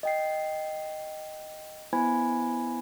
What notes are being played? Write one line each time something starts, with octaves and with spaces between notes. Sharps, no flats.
D#5 G5 C7
B3 E4 C5 G#5 B5 G#6